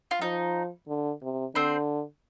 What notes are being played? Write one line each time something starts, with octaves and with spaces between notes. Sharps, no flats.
F4
F3 D#4
D3
C3
D3 C4 C5